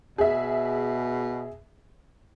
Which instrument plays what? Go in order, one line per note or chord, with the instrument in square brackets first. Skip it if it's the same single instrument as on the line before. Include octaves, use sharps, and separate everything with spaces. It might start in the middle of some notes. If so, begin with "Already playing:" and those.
[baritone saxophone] B2 [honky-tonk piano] G#4 E5